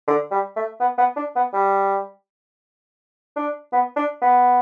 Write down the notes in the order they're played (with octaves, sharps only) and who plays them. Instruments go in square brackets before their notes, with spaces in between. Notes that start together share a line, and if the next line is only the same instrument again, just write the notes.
[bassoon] D3
G3
A3
B3
B3
D4
B3
G3
D4
B3
D4
B3